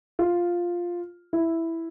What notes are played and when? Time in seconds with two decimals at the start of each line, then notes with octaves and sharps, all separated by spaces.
0.19 F4
1.33 E4